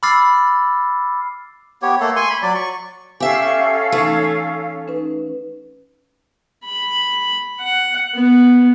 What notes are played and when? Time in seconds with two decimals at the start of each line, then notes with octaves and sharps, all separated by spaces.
0.03 B5 D6 E6 F6 A6 C7
1.82 B3 G4 C#5
2.00 A3 A#3 A4
2.16 G#5 C6 C#6
2.30 B5
2.42 F#3 D5
2.55 C#6
3.20 C#4 G4 A4 E5 F5 G#5 E6
3.92 E3 A3 D#4
4.88 C#4 D#4 B4
6.64 B5
7.60 F#5
8.15 B3